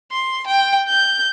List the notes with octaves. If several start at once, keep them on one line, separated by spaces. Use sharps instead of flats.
C6
G5
G6